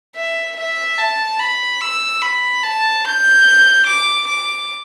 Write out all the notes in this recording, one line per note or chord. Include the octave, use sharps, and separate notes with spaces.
E5
E5
A5
B5
E6
B5
A5
G6
D6
D6